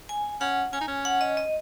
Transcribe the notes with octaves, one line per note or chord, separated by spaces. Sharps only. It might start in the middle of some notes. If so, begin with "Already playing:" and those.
G#5
C#4 F#5
C#4 G#5
D#4
C#4
F#5
D#5
D#5